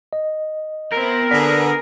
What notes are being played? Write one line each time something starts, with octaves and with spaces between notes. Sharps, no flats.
D#5
B3 C4 E4 A#4
D3 B3 G#4 D5 B6